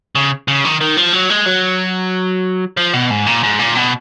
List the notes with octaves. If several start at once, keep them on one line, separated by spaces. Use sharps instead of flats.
C#3
C#3
D#3
D#3
F3
F#3
G#3
F#3
F3
B2
G#2
A#2
G#2
A#2
B2